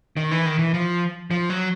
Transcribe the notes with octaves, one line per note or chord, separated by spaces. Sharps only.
D#3
E3
D#3
E3
F3
F3
F#3